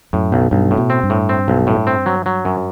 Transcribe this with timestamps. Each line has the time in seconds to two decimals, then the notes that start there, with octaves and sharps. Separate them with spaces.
0.13 F#2 A2
0.32 B1
0.51 B1 G2
0.71 A2
0.77 B2
0.90 C4
1.03 G2
1.10 A2
1.29 C4
1.48 B1
1.67 A2
1.87 C4
2.06 F#3
2.26 F#3
2.45 F#2